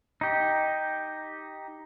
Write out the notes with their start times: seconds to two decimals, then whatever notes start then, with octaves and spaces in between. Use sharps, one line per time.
0.21 D#4 G4